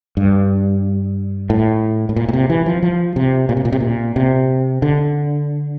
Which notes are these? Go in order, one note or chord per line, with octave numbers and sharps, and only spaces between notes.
G2
A2
A2
A#2
A#2
C3
E3
F3
F3
C3
A#2
C3
A#2
C3
A#2
C3
D3